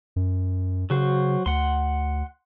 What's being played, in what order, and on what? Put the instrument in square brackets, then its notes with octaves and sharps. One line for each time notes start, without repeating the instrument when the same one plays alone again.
[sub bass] F#2
[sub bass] C#3 [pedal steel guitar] F#3 F#4 C5
[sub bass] D2 [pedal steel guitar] F#5 C6